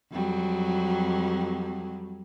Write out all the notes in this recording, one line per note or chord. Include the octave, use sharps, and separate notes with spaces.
F2 F#3 G3